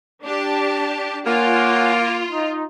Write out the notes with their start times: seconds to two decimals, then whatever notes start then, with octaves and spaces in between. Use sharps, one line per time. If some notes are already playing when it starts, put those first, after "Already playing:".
0.23 D4 G4 A5
1.26 A#3 F4 C#5 F#5 G#5
2.31 D#4